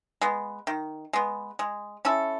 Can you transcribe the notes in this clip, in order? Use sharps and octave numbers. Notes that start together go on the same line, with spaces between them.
G#3 B3
D#3
G#3 B3
G#3
C#4 E4 A4